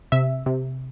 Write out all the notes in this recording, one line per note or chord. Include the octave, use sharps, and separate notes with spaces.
C3 E5
C3